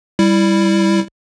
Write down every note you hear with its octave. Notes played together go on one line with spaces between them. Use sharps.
G3 E4